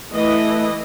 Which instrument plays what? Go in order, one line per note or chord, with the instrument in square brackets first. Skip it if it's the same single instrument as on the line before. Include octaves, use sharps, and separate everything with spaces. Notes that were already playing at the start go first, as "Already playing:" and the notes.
[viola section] E3 E4 D#5 [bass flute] A3